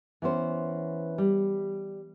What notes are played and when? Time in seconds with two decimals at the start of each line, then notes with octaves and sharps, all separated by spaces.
0.22 E3 B3 C#4 C5
1.18 G3